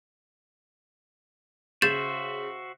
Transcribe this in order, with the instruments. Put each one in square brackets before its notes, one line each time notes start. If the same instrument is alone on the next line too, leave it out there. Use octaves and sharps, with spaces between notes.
[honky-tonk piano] C#3 [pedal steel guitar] F#4 C5 E5 [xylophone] G6 A6 E7